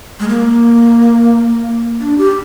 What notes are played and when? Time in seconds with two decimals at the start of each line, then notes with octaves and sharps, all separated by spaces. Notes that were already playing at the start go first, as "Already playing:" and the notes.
0.20 G#3
0.29 A#3
2.00 D4
2.18 G4